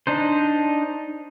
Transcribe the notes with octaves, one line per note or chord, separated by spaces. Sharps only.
D4 D#4 C5